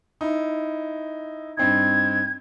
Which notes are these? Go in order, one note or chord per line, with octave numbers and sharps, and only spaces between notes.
D#4 E4
G2 C4 D#4 G#6